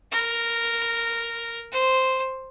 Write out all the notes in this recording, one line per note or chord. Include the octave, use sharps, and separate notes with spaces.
A#4
C5